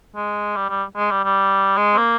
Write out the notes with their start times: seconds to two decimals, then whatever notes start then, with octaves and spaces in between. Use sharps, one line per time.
0.16 G#3
0.56 G3
0.69 G3
0.96 G#3
1.11 G3
1.24 G3
1.77 G#3
1.94 C4
1.97 A#3